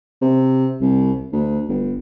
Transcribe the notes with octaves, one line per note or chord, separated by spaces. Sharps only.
C3
C2
D2
G1